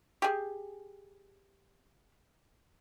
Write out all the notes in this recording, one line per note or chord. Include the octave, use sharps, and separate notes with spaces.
G4 G#4